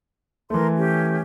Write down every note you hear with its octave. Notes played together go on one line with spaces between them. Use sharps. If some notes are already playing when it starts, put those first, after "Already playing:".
E3 A3 A#4 C6
C#4 G4